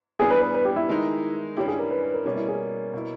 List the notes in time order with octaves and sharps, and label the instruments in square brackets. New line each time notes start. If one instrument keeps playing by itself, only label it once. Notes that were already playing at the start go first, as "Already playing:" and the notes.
[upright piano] G2 G3 B3 E4 [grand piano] G#4
[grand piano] B4
B4
B4
G4
E4
[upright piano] D#3 G#3 D#4
[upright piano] G2 G3 C#4 E4 [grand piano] G4
[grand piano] G#4
A#4
B4
B4
A#4
[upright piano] B2 G3 A#3 C#4 [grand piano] G4
[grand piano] E4
G#4
[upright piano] B2 A#3 E4